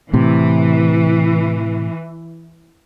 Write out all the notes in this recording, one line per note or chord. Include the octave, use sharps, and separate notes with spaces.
A2 C3 E3